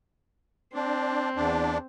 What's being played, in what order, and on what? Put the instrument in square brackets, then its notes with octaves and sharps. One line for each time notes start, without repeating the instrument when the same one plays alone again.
[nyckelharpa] C4 [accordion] D4
[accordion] E2 D4